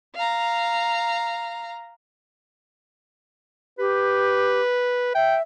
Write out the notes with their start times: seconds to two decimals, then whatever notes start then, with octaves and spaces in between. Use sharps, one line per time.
0.17 F5 A#5
3.79 G4 B4
5.15 E5 G5